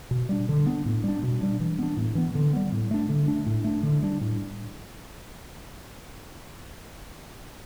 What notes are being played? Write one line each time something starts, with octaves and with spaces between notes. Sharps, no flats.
B2
G3 B3 D4
D3
B3 D4
A2
G3 D4
B2
G3 D4
E3
B3 D4
A2
E3 B3
D3
G3 B3
A2
A3 D4
D3
A3 D4
A2
A3 D4
D3
G3 D4
A2